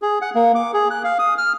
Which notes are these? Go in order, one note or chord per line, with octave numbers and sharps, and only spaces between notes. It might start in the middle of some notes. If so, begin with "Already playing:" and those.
G#4
F#5
A#3
D6
G#4
F#6
F5
D#6
F6